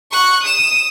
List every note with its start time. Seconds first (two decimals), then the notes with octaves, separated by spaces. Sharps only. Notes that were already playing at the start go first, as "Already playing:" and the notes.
0.12 C#6 F#6
0.43 D#6 E7